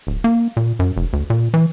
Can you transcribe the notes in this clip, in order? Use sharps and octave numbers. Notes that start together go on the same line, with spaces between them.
D1
A#3
A#2
F#2
F1
D2
A#2
E3